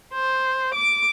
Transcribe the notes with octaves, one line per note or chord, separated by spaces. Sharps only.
C5
D6